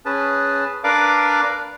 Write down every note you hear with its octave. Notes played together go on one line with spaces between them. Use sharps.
C#4 G#4 B4 A5
D4 A#4 B4 D5 F5 D6